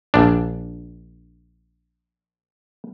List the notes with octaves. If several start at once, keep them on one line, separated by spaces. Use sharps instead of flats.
A#1 D4